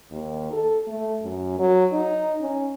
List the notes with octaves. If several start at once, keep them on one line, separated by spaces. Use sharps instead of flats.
D#2
A4
A3
F#2
F#3
D#4
C#4